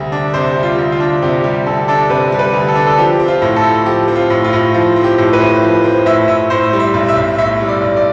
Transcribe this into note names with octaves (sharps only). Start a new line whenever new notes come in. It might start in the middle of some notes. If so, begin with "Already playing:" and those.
Already playing: D2 C3 G3
D4
C3 C5
G3
F4
D2
F4
D4
C3 G4
G3 G4
D2 A4
D4 A4
C3 B4
G3
B4
D2
A4
D4
A4
F3 G4
C4
F4
A2
A4
A2
F3 G4
C4
F4
A2
F4
A2
F3 F4
C4
G4
A2
B4
A2
F3
C4
A2 E5
A2 E5
A2 C5
G3
E5
B1
E5
B1
A2 E5
G3
D5
B1
D5